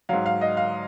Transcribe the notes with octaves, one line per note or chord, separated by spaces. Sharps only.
G#2 F#3 F5
F5
D#5
F5